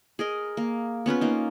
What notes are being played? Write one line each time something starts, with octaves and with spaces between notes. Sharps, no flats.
G#4 A#4 D#5
A#3
B3 C#4 F4 B4
A#3 D#4